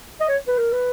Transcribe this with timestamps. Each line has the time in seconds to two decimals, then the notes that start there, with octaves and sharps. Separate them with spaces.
0.20 D#5
0.29 C#5
0.48 B4
0.58 A#4
0.72 B4